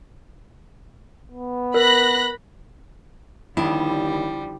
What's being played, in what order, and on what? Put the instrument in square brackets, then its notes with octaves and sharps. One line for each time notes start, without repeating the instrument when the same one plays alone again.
[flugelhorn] B3
[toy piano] A#4 [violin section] B5 F#6 A#6
[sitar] D#2 [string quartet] D3 F3 G3 [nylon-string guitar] E4